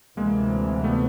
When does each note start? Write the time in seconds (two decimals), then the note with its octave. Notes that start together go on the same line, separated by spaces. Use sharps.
0.17 D2 C3 E3 G#3 A#3
0.84 A3 B3